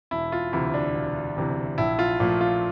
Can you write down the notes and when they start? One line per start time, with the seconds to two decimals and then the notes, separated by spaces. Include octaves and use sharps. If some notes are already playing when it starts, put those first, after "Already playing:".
0.11 E1 E4
0.32 F4
0.53 D2 C3 E3 E4
0.74 D4
0.94 E1
1.36 D2 C3 E3
1.78 A#1 E4
1.99 F4
2.20 A#2 F3 A3
2.41 F4